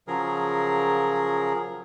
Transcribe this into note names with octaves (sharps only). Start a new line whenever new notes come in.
C#3 F3 F#3 G#4 A#4